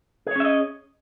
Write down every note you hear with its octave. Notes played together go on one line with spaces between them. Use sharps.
C#4 G#4 C#5 D#5 E5